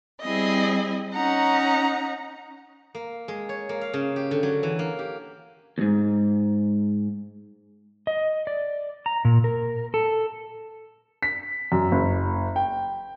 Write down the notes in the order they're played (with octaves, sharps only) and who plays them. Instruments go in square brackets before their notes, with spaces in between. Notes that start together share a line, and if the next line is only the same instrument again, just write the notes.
[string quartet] G3 C4 E4 G#4 D#5
C#4 D#4 F#5 A#5
[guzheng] A#3
G#3
C#5
A#3
F5
C#3
G4
D3
F#3
E3
A#3
G4
[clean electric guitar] D#2 G#2
[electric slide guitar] D#5
D5
A#5
A#2
A#4
A4
[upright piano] B6
F#2
F#1
G5